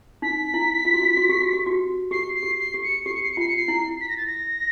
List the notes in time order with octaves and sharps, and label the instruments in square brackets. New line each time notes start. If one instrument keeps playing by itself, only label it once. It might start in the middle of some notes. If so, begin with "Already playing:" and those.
[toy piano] D#4 [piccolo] B6
[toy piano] E4
F4
F#4
F4
F#4
G4
F#4
G4
F#4
[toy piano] G4 [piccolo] C7
[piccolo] C7
[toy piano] G4
[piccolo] C7
[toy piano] G4
[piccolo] C#7
[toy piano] G4 [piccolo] C7
[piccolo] C#7
C7
C#7
[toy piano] F4 [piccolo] C7
[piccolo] C#7
C7
[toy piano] E4
[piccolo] B6
A#6
A6
A#6